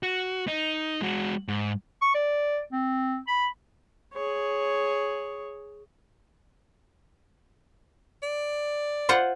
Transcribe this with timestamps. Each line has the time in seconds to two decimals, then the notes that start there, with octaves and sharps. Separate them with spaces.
0.03 F#4
0.48 D#4
1.02 G#3 F#4
1.48 G#2
2.02 C#6
2.15 D5
2.72 C4
3.27 B5
4.14 G#4 C#5
8.23 D5
9.09 F4 C5 F#5